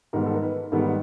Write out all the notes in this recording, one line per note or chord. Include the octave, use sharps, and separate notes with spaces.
G#2 D#3 G3 B3 A#4
A4
A#4
B4
G#2 D#3 G3 B3 A4